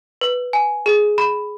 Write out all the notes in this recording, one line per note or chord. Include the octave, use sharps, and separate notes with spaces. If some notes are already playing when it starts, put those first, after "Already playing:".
B4
G#5
G#4
B5